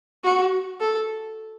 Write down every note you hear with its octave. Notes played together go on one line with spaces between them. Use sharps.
F#4
A4